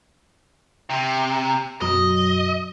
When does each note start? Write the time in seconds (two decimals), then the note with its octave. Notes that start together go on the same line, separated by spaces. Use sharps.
0.90 C3
1.81 F#2 B2 F#3 D#5